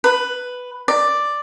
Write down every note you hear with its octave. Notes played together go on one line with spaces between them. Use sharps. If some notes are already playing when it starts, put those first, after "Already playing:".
B4
D5